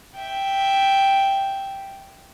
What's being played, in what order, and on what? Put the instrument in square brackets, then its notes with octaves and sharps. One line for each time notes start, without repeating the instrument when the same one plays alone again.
[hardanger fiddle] E5 G5